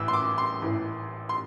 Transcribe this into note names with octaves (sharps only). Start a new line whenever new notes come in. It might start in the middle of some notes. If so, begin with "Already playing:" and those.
Already playing: A1 A2 E3 E6
C6
D6
C6
A1 A2 E3
C6